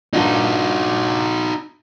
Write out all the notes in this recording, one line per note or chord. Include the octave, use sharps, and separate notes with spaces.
G2 A#2 D4 D#4 F#4